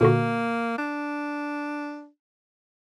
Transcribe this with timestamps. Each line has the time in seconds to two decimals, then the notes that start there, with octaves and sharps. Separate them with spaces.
0.01 A#2 D3 A#3 F#4
0.78 D4